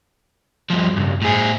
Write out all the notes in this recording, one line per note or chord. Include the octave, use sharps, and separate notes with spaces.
G2 F3
C#2 G2
A2 G#4